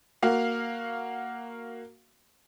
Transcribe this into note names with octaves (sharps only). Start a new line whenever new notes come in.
A#3 F#4 F5